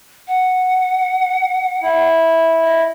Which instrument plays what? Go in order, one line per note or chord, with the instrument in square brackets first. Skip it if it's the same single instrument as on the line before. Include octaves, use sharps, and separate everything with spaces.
[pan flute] F#5
[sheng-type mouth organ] E4
[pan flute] D#5